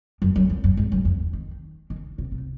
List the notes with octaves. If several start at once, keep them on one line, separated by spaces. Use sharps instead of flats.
F#2
F#2
F2
F#2
G#2
F#2
F2
D#3
D#3
C3
C3